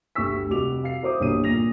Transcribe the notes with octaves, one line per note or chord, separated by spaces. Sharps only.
G1 D2 G4 C#6 E6 B6
F1 G3 F#4 D6 F7
F5 C7
E4 F#4 A#4 C5 D6 D#6
B1 G2 D3 A#3 D#6 D#7
D1 A#2 A#3 A#6 F7